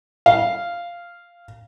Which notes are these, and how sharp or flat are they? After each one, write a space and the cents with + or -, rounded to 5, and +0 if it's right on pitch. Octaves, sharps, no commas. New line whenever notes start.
F5 -10